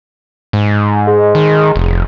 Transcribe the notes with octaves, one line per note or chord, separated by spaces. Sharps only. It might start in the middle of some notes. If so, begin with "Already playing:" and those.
G#2
G#3
D#3
F1